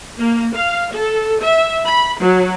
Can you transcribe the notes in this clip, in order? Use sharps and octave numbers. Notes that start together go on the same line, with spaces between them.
A#3
F5
A4
E5
B5
F#3